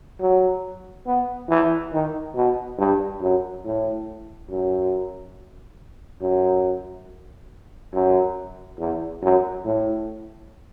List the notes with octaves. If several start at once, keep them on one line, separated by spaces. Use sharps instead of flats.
F#3
B3
E3
D#3
B2
G2
F#2
A2
F#2
F#2
F#2
E2
F#2
A2